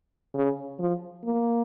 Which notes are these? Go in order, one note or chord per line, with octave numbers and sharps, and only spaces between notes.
C#3
F3
A#3